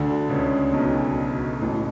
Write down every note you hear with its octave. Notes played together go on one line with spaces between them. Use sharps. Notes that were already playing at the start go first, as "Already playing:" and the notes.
Already playing: D2 D3
C#2 C#3
B1 B2
A1 A2